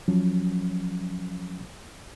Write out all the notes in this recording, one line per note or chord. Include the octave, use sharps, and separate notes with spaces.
F3 F#3 C#4